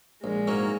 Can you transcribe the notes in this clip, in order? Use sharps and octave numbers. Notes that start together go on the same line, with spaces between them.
A#1 G#3
G#2 F#3 A#3 C#4